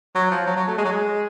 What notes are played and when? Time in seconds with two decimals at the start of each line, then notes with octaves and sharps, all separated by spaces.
0.15 F#3
0.31 F3
0.46 F#3
0.56 F#3
0.68 A3
0.78 G#3
0.85 F#3
0.92 G#3